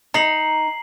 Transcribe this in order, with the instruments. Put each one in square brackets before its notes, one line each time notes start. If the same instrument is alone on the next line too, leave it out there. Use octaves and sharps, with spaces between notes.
[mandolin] D#4 [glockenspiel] A#5 C7 F#7